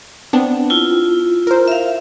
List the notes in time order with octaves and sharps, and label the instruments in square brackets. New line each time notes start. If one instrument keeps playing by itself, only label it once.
[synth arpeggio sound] B3 C4 D4
[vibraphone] E4 F4
[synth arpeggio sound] A#4 C5
[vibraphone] E5 F5